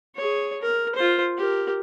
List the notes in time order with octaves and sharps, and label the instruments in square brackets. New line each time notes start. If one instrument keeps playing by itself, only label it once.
[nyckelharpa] G#4 C#5
A#4
F4 C5
G4 A#4